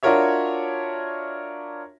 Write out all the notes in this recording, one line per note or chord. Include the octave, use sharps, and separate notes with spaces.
D4 F4 F#4 A#4 C#5 E5